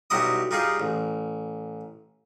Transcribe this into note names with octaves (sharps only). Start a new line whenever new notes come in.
B1 F#3 G3 E4 D#5 D#6
G3 D#4 F4 G#4
A1